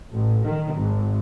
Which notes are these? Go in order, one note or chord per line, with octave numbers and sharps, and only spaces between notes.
A1
D#3
G#1